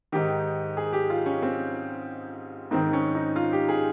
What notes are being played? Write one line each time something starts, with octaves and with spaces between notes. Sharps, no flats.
G#2 D#3 G4
G#4
G4
F4
C#4
C4
G#2 D#3 C4
C#4
D#4
F4
G4
G#4